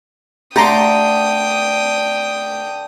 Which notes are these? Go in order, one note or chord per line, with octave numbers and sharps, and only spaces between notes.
D3 A3 G4 G5 A#5 C6 D6 D#6